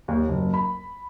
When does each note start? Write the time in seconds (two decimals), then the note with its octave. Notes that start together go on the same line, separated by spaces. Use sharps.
0.08 D#2
0.29 F#1
0.54 B5